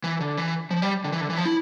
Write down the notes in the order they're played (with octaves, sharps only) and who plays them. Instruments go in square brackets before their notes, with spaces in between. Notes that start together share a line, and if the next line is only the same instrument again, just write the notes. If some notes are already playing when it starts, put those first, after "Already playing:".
[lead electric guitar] E3
D3
E3
F3
G3
D3
E3
D3
E3
F3
E4